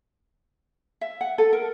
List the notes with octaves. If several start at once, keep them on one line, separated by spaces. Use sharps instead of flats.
E5
F#5
A4
A#4